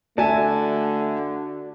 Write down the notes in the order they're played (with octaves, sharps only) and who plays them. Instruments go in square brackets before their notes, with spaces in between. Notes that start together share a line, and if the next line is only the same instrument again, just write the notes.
[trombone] D3 [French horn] A3 [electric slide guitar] F#4 D5 [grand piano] E5 G#5 A5